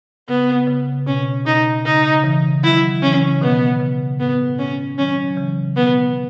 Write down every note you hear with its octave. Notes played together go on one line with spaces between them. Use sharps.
C#3 B3
C#3
B2 C#4
B2 D#4
C#3 D#4
C#3 E3
D#3 F#3 E4
C#3 E3 C#4
B2 D#3 B3
C#3
A2 B3
C#4
D#3 F#3 C#4
F#3
C#3 E3
B2 D#3 B3